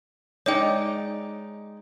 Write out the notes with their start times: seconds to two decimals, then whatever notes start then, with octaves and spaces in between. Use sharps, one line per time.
0.46 G#3 D#4 C#5 D5 G5